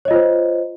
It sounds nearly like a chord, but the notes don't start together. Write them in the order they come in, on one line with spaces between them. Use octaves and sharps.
C#5 D#5 F4 C5